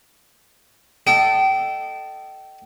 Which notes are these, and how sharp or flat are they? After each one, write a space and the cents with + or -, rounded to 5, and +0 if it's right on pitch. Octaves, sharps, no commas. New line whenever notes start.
A4 +0 D#5 -20 G5 -30